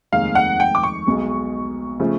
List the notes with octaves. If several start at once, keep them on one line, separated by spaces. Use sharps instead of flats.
F1 D#2 D#3 G#3 F5
F#5
G5
D6
C#6
B1 B2 G#3
C#3 F3 A3